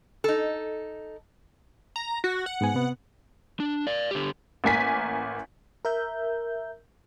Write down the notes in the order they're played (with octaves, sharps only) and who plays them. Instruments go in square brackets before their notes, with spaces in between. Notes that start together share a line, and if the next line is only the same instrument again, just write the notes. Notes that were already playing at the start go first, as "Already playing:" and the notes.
[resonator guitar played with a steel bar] D#4 A4
[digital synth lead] A#5
F#4
F#5
[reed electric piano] G#2 B3 G#5
C3 B3
[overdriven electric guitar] D4
D5 F5
D3 G4
[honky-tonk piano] A1 A#3 G#5 B6
[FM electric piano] A#4 E5 G6